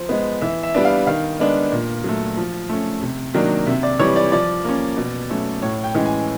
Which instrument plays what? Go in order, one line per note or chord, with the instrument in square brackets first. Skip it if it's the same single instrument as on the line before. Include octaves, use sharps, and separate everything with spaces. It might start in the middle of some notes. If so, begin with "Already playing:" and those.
Already playing: [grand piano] F3 C5
G#3 B3
E3 E5
E5
G3 B3 D4
F5
D#3 F5
G#3 B3 D4
A#2
F#3 A3
F3
A3 C#4
C3
D#3 F#3 A#3 D4
C3 E5
D5
E3 G3 C#5
D5
F3 D5
A#3 C#4
B2
F#3 A3 C#4
A2 C#5
G5
E3 G#3 C#4
G#5